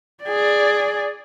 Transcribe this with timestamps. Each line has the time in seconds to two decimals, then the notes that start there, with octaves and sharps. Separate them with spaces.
0.24 G#4 D5